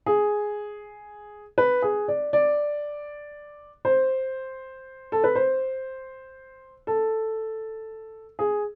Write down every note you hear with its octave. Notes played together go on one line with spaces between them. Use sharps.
G#4
B4
G#4
D5
D5
C5
A4
B4
C5
A4
G#4